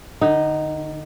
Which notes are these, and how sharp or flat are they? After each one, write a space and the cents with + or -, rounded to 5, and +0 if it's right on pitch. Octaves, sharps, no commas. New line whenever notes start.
D3 +35 D#4 +0